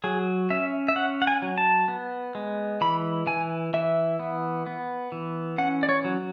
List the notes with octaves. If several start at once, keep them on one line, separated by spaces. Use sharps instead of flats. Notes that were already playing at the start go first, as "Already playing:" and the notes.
F#3 G#4
C#4 E5
E5
C#4 F#5
F#5
G#5
F#3
A5
B3
G#3
E3 B5
E3 G#5
E3 E5
B3
B3
E3
C#4 F#5
D5
C#5
F#3